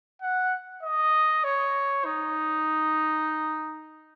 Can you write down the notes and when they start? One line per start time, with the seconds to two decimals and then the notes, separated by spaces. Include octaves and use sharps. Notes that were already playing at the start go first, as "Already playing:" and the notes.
0.22 F#5
0.83 D#5
1.44 C#5
2.05 D#4